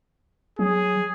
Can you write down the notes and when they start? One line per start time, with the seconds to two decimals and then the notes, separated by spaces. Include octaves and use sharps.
0.59 F#3 G#4